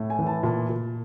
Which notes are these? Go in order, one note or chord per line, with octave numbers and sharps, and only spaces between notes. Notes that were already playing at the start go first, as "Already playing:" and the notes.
Already playing: A2
G#5
E3
A5
A#2 A5
A#2